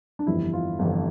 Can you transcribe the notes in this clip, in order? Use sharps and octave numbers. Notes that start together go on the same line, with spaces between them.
D4
G1 F2 E3 G3 E4
F4
G1 F2 E3 G3